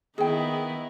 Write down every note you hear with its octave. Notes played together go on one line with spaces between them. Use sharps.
D#3 B3 E4 G#4 G5